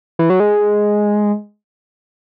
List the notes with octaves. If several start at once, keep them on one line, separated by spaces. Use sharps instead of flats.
E3
F#3
G#3